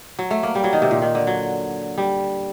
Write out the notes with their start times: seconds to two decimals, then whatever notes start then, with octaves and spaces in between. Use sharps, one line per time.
0.19 F#3
0.31 A3
0.43 A#3
0.55 G3
0.64 F#3
0.73 D#3
0.82 C3
0.91 A#2
1.02 D#3
1.15 D3
1.27 F#3
1.98 G3